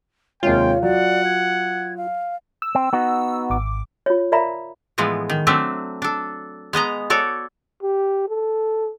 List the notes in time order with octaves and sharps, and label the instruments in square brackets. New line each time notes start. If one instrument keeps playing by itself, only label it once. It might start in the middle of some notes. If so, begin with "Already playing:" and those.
[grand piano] D#2 C3 G#3 [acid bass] F4 [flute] C#5 [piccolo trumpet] G5
[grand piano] F#3 [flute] D5 [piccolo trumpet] F#5
[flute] G#6
F5
[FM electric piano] E6
[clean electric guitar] C4
B3 D#4 F#4
[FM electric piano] G#1 D6
[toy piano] F4 C#5
A#4 D5 E5 F5 A#5 B5
[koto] A2 E3 F3 G#3 B3
D#3
F#3 A3 C4 D4 E5
D4 A4
G#3 B3 D#5 A#5
F#4 A4 C#5 D5
[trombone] G4
A4